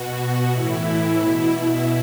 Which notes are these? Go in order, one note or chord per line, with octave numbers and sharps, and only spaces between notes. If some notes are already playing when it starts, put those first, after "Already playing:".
Already playing: B2 F#4
F#4
A2 E3 E4
B2